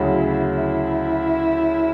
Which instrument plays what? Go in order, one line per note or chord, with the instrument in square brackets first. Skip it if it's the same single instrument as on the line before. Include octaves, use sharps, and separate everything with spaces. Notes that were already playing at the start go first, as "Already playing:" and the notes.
Already playing: [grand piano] D2 C#3 F#3 [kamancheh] E4
[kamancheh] E4